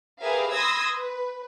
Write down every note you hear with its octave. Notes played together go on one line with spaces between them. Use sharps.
G4 G#4 A#4 B4 E5 F5
B5 C6 D#6 E6 G#6 A#6
B4